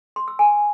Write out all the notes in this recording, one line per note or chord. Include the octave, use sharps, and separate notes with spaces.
C6
E6
G#5